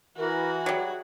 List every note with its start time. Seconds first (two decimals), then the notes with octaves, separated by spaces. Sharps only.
0.17 E3 F#4 A#4
0.66 F#3 G3 G#4 E5 F#5